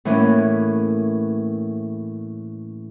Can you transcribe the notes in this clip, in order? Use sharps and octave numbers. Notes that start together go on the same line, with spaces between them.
A2 E3 A#3 C#4